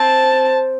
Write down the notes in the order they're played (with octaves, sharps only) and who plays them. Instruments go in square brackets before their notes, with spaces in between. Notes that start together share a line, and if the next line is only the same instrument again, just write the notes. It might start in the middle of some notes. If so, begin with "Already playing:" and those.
Already playing: [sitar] C4 [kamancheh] A5